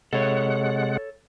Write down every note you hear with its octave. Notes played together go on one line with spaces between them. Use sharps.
C3 G#3 A4 C#5 F#5